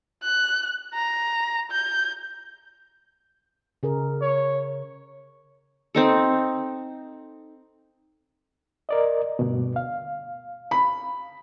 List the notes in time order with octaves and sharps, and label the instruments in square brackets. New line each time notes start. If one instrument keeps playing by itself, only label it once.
[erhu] F#6
A#5
G6
[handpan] C#3 G#4 A#4
[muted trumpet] C#5
[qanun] C4 D#4 A4
[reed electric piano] A#4 D5 D#5
D2 G2 B2
F5
[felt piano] B5